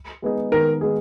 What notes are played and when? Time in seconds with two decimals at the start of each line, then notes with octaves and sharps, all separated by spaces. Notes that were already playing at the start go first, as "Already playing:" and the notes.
0.22 G#3 B3 D#4 G#4
0.52 D#3 A#4
0.81 G#3 B3 D#4 G#4